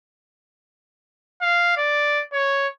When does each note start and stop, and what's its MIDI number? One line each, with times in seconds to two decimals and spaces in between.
1.42 1.72 77
1.77 2.22 74
2.33 2.67 73